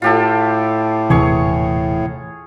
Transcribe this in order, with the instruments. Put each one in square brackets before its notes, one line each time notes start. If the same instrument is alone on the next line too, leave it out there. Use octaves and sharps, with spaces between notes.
[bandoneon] A2 [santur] F4 G4 A4
[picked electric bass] D#1 C3 [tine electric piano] E3 [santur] G#4 C#5 C#6